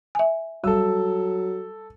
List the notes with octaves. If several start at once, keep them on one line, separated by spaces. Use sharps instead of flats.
E5 G#5
F#3 G3 A4 E6